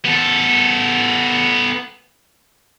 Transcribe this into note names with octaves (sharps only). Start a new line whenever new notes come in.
B3 A4